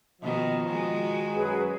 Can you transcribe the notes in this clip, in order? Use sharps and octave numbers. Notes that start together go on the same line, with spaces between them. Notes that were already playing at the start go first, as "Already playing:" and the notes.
B2 D#3 F3 F#4 D#5
D#3 G#3 F#4
F#2 F#3 G#4 B4